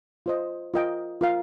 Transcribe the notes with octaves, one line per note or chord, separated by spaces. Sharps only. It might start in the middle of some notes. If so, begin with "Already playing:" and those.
F4 C5 D#5
F4 A#4 D#5 G5
F4 A#4 F5